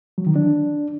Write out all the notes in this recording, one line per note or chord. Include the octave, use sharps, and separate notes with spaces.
F#3
D#3
D4